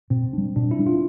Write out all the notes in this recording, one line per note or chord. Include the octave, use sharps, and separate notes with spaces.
B2 C4
G3 D4
B2 D4
E4
G3 D4
F4